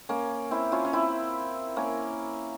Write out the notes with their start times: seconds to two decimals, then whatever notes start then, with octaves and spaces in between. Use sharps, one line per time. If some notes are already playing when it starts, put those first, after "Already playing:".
0.09 A#3 C#4
0.51 C4 E4
0.72 C#4 F4
0.85 C#4
0.93 C4 E4
1.77 A#3 C#4